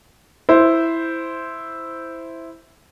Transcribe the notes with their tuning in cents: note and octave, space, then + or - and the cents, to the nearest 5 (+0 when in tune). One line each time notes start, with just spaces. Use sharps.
E4 +0 C5 -5